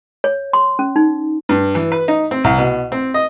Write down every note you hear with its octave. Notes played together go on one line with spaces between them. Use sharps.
C#5
C6
C#4
D#4
G2
E3
B4
D#4
C4
C2
B2
C4
D#5